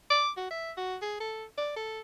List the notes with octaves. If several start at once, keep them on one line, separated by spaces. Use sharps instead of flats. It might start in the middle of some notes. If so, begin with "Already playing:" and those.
D6
F#4
E5
F#4
G#4
A4
D5
A4